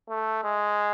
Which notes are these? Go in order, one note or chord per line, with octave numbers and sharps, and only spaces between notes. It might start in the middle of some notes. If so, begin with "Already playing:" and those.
A3
G#3